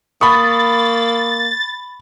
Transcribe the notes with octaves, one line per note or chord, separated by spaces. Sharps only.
A#3 B5 C#6 D#6 A6